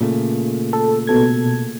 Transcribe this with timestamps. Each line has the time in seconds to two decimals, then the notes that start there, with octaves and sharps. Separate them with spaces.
0.01 A#2 C#3 A3
0.73 A4
1.07 B2 A4 G#6